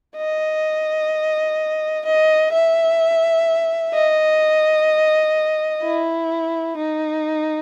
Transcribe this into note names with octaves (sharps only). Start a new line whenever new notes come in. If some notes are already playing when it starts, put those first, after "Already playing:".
D#5
D#5
E5
D#5
E4
D#4